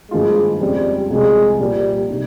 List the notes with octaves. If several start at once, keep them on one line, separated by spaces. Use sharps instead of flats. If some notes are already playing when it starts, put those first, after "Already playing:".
G#1 G2 F3 G#3 A#3 F4
F2 C#3 G3 G#3 C4
C2 C3 F3 G#3
A#2 F3 G3 A#3 F4
C3 G3 C4 D#4